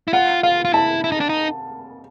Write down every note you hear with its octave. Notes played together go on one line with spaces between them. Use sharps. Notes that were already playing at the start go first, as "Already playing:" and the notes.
E4
F4 F#5
F4 F5
F4
E4 A5
E4
D#4
D4
D#4